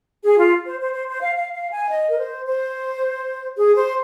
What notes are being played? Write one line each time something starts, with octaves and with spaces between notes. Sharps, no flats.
G#4
F4
C5
C5
C5
C5
F5
F5
F5
G#5
D#5
A#4
C5
C5
G#4
C5